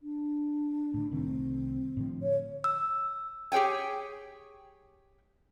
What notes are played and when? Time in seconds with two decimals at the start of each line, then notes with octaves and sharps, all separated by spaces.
0.01 D4
0.94 A2 D3
1.11 C2 D#3 A3 C4
1.97 A2 D3 F3
2.22 C#5
2.64 E6
3.52 G4 G#4 C#5 G5 G#5